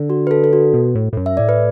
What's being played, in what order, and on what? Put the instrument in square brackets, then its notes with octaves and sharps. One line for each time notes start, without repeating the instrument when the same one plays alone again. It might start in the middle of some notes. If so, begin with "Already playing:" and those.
Already playing: [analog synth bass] D3
[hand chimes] F#4
B4
A4
A4
F#4
[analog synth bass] B2
A2
A2
F#2
[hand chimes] E5
[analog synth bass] A2 [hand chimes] D5
[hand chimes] B4